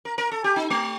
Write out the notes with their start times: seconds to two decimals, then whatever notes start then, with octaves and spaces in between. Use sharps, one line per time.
0.05 A#4
0.18 A#4
0.32 A4
0.44 G4
0.56 D#4
0.70 A3